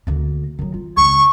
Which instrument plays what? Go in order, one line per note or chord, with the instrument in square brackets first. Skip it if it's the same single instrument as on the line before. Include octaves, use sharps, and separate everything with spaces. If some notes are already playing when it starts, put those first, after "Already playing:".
[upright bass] D2 A#3
D#3 F#3
F4
[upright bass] C#2 [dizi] C#6